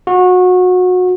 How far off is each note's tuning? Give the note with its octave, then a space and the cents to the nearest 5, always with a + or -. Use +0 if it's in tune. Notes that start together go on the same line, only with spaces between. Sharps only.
F#4 -25